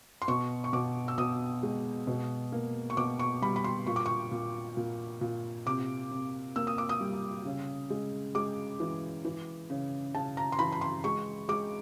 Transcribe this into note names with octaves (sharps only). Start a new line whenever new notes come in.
C6
B2 C#6
C#6
B2 D6
E6
B2 D#6
G#3
B2
A#3
C#6
B2 D6
C#6
G3 B5
B5
C6
A#2 C#6
D6
C#6
A#2
A#2
A#2
C3 D6
C3
A#3 E6
D#6
D6
D#6
G3
C#3
G#3
G#3 D6
E3
E3
C#3
C#3 A5
A#5
C6
E3 B5
B5
C6
G#3 C#6
G#3 D6